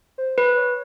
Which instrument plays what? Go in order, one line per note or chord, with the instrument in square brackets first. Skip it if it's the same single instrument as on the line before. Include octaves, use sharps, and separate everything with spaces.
[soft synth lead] C5
[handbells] B4
[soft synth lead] C#5